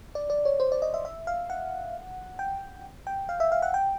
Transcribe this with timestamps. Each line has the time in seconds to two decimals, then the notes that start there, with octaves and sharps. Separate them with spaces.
0.15 D5
0.30 D5
0.45 C#5
0.60 C5
0.72 D5
0.82 D#5
0.94 E5
1.05 E5
1.27 F5
1.50 F#5
2.39 G5
3.07 G5
3.29 F5
3.40 E5
3.52 F5
3.62 F#5
3.74 G5